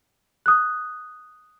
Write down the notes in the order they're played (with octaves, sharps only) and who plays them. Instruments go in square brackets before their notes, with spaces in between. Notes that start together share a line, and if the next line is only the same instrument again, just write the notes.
[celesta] D#6 F#6